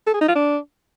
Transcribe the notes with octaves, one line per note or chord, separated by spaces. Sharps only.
A4
G#4
D#4
F4
D4